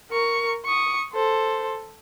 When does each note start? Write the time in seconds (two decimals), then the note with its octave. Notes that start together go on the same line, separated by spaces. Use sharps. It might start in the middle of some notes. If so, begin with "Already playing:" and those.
0.11 A#4 C#6
0.66 C#6 D#6
1.13 A4 C5